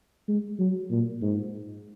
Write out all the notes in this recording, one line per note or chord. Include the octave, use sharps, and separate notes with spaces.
G#3
F#3
A#2
G#2